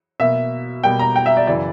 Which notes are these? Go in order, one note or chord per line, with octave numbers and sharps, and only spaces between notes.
B2 A#3 E5
B2 G3 A#3 G5
A#5
G5
E5
D5
F#2 C#3 E3 D5